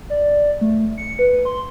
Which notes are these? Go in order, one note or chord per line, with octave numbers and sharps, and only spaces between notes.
D5
A3
C#7
B4
C6